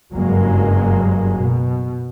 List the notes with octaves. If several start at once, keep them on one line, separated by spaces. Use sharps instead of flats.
F#1 G2 F#3 G#3 A#3
B2